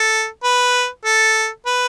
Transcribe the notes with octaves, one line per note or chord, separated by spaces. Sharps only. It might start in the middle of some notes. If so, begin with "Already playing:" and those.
Already playing: A4
B4
A4
B4